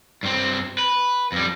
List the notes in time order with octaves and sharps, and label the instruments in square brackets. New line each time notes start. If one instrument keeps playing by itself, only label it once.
[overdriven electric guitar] G2 C4
B4
F2 G3